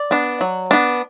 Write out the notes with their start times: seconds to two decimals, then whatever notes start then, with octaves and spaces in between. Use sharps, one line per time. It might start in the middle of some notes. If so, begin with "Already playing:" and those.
Already playing: D5
0.11 B3 D4
0.41 F#3
0.71 B3 D4